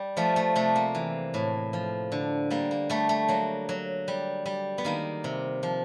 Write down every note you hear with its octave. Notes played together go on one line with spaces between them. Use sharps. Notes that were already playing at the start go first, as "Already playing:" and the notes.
Already playing: G3
F3 A3
A3
C3 A3
A#3
E3
A2
F3
D3
G3 A#3
A#3
G3 A3
A3
F#3 A#3
F#3
G3
G3
B3
D#3 A#3
C3
F3